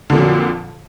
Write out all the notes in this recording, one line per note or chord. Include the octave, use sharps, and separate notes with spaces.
F2 A#2 D3 F#3